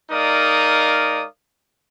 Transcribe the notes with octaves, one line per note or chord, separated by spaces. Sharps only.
G#3 D#4 A#4 D5 F5 D#6